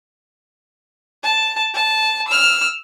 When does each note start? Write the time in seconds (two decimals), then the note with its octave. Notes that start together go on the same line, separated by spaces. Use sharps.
1.23 A5
1.74 A5
2.28 E6 F6